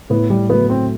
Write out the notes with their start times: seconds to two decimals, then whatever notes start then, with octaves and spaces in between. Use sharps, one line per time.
0.10 A2 B3
0.30 G3
0.50 F#3 A3 B3
0.70 C4